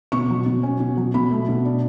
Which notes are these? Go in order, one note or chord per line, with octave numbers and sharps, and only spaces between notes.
B2 C#6
F#3
B2
C#4
B2
F#3
B2 B5
A3
B2
D4